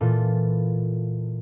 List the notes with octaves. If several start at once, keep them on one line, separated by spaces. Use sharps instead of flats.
A#2 E3 F4 A4